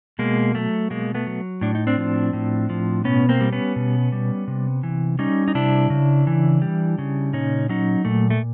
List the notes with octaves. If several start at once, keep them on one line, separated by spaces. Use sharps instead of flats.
B2 G#3 A#3
F#3 A3
B2 G#3 A#3
A3 B3
F#3
A2 D4
D#4
C4 D4
F3
A2
F3
B2 B3 C#4
A#3 C4
G3
B3 C#4
B2
G3
C3
E3
G3 C#4 D#4
D#4
C3 D4 E4
C#3
E3
G3
C#3
A#2 C#4 D#4
F#3 C#4 D#4
A#2 A3
A3